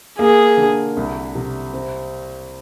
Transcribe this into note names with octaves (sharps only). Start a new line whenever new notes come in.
A#3 G#4
D3
C2
C3
C4